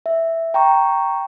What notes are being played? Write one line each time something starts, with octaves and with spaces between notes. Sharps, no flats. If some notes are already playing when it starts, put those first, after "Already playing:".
E5
G5 A#5 C#6